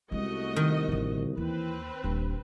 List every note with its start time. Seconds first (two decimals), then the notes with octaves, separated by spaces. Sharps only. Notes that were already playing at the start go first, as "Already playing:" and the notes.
0.12 C2 G#3 A3 C#4 F#4 D#5
0.56 D#3
0.88 A1 D3
1.37 D#2 E3 C4 B4
2.04 D#1 G2